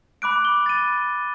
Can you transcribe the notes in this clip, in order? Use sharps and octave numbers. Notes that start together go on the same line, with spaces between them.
B5 D6 F#6 D7
G7
A6 D#7